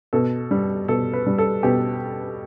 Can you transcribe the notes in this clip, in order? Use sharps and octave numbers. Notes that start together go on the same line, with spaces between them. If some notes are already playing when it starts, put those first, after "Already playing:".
B2 A4
G3
B2 A4
B4
G3
A4
B2 G4